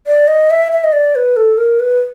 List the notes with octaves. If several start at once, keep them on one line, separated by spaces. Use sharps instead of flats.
D5
D#5
E5
E5
D#5
D5
B4
A4
A#4
B4